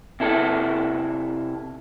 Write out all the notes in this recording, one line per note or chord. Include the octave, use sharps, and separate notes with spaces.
C3 E4 A4